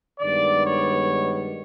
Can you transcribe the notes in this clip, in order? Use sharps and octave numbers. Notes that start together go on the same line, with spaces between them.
G2 D#3 G#3 B3 D5
C#5